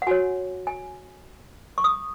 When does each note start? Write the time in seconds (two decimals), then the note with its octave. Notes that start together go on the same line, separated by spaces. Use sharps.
0.02 F#5
0.07 F#4 C#5 G#5
0.67 G#5
1.78 C#6
1.84 D#6